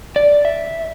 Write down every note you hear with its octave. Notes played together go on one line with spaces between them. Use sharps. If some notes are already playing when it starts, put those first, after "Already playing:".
D5
E5